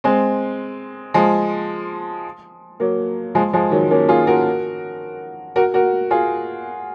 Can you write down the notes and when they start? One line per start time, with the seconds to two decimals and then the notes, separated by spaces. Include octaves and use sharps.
0.04 G#3 C4
1.14 F3 G#3
2.80 F#3 A#3
3.35 F3 G#3
3.53 F3 G#3
3.71 D#3 F#3
3.91 A#3 C#4
4.09 F4 G#4
4.27 F#4 A#4
5.56 F#4 A#4
5.74 F#4 A#4
6.11 F4 G#4